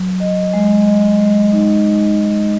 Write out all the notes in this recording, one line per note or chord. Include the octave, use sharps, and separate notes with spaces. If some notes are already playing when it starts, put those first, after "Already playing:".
Already playing: F#3
D#5
G#3
D#5
G#3
D#4
D#4
D#4